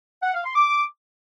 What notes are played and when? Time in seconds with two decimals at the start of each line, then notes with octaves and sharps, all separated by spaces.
0.23 F#5
0.33 F5
0.44 C6
0.55 D6